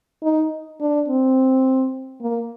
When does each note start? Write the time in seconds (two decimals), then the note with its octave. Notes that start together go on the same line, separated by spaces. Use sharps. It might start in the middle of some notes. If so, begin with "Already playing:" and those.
0.23 D#4
0.80 D4
1.08 C4
2.21 A#3